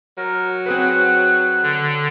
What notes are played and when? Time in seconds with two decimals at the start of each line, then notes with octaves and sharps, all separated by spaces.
0.18 F#3 A#4
0.66 C4 G#4 B4 F#5
1.63 D3